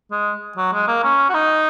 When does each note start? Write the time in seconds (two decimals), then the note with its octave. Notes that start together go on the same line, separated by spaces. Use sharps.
0.11 G#3
0.57 F#3
0.73 G#3
0.87 A#3
1.03 C#4
1.29 F#4
1.34 D#4